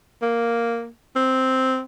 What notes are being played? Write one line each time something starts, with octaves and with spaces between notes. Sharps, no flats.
A#3
C4